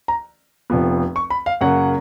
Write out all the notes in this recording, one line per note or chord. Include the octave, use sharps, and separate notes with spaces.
A#5
F1 F2 F3 B3
C#6
B5
F5
F#2 C#3 F#3 A#3 F#5